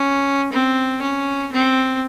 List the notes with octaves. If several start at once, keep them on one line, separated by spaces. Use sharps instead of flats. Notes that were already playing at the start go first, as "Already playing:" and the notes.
Already playing: C#4
C4
C#4
C4